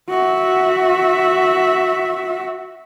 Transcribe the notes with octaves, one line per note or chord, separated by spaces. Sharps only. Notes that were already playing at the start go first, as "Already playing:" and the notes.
F#4 E5